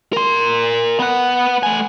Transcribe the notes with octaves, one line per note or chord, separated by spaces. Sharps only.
A#4 C6
B3 F#5
A3 G#5